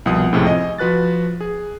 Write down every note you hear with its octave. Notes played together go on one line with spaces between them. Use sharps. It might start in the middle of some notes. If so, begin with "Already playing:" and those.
C2 B2 F3 F#5 D#6
C#2 A2 C3 F3 G#3
D#5 G#5
F3 F#4 B4 F#6 A6
G#4